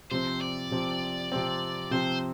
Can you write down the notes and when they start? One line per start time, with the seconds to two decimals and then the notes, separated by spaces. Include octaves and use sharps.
0.11 C3 F3 C4 C5
0.41 D5
0.71 C3 F3 C4
1.32 C3 F3 C4
1.91 C3 F3 C4 C5